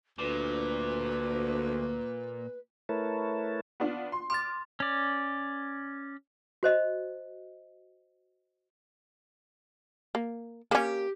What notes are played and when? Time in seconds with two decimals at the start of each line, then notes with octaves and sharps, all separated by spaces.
0.18 D2 A#2 B4
2.89 A3 E4 A#4 B4 C#5 A5
3.80 B3 D4 F4
4.12 C6
4.30 C6 D6 F6 A6
4.80 C#4 D5
6.63 F#4 C5 D#5
10.15 A#3
10.71 A#3 C#4 G4